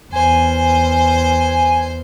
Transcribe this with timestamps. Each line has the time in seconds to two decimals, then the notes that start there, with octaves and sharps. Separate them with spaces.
0.12 E2 C5 G#5